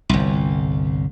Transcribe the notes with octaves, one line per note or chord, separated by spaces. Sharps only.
G1 C2